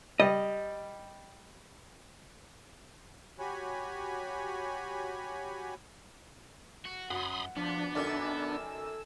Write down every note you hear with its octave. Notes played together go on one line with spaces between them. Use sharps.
G3 D#5
F#4 G4 C#5 G#5 B5
F#4
F#2 F#4 B5 C6 D#6
F3 B3 D4
F#2 D#3 A4 D5 G#5 E6